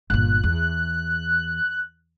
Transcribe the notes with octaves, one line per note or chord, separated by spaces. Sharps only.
G1 A#2 F#6
E2